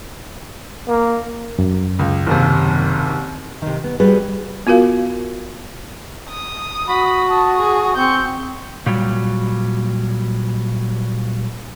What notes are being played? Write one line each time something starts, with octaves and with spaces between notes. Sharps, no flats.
A#3
F#2
C#2
F#1 D#2 C3
C3 D#3
B3
G3 F#4 G#4 B4
B3 F4 F#4 A#4 F5
D#6
F#4 B5
A5 D#6
G#4
C4 C#6 G6
A#2 F#3 G3